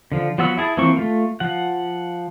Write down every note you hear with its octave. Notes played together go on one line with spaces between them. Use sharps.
D3 F3
F3 F#3 B3 F#4 E6
E4 G#4 A5
E3 F3 A#3 C4 C#6
A3 F4
F3 F#5